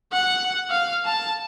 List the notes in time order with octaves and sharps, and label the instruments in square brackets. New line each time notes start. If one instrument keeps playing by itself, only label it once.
[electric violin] F#5
F5
A5